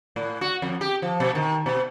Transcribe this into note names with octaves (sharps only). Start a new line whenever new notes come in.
A2
F#4
F2
G4
F3
B2
D#3
B2